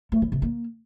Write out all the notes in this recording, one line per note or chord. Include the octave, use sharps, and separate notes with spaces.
A3
E3
C3
A#3